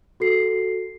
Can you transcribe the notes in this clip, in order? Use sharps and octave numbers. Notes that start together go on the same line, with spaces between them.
F#4 A4 C7